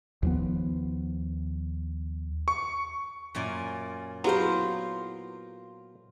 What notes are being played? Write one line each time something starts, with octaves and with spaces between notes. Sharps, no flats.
D#2 F3 B3
C#6
F#2 A#2 G#5
F#3 B3 E4 F4 G4 A#4 C5